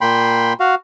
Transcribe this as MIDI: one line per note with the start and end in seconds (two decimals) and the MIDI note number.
0.01 0.53 46
0.01 0.53 58
0.01 0.53 79
0.01 0.53 83
0.01 0.53 84
0.60 0.75 66
0.60 0.75 77